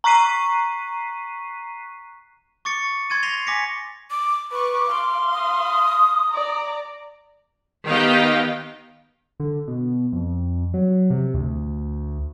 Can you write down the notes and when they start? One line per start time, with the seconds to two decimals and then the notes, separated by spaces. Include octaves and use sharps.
0.04 A#5 C#6 F#6 B6 C7 D#7
2.65 C#6 D6 A6 C#7
3.10 C6 G#6 A6 D#7
3.23 G#6 A#6 C7 D#7 F7 G7
3.47 G#5 D6 A#6 B6 C#7
4.11 D6
4.51 B4 C#6 D6
4.88 F5 C6
5.33 D#6
6.31 D5 A#5
7.88 D#3 B3 G4 D#5 F5 G5
9.40 D3
9.68 B2
10.12 F2
10.74 F#3
11.10 C3
11.34 D2